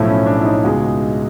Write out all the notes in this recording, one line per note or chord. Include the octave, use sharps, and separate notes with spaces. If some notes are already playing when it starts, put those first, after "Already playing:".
Already playing: B1 A2 F3 A3 E4
C#4
D4
E4
D#4
C#2 B2 G#3